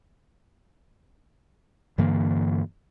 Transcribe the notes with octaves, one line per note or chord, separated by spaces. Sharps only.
G2 D3 E3 A#3